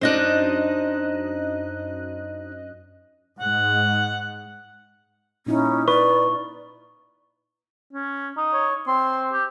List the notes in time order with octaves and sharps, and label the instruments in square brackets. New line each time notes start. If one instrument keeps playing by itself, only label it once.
[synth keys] F#2 D#5 F#6 [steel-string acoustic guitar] D4 D#4 C5
[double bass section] G#2 [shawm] F#5
[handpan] A#2 D#4 E4 [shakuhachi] C#4
[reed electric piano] B4 [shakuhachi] D5 [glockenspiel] C#6
[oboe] C#4
[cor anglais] D#4
[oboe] C#5
[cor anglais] C4 [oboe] C6
[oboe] G4